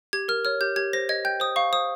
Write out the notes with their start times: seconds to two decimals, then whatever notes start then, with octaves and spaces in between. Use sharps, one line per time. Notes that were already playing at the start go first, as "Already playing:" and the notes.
0.13 G4 G#6
0.28 A#4 F6
0.45 C#5 F6
0.61 G4 G6
0.76 G4 G#6
0.93 C5 A#6
1.09 D#5 G#6
1.25 G5 G6
1.40 C5 D#6
1.56 F5 C#6
1.73 C5 D#6